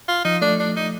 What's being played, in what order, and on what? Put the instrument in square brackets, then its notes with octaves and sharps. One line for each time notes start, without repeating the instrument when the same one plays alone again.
[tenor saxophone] F4
[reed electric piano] F3 [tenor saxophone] D#4
[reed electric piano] A3 [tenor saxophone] D4
[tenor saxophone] D4
D#4